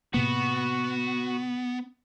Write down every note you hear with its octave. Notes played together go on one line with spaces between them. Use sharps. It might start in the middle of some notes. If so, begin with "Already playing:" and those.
A2 C3 A#3 B3 F#4